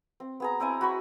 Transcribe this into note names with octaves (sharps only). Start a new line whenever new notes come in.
C4
B3 G#4 A#5
C4 E4 D#5 G#5
F#4 B5 C#6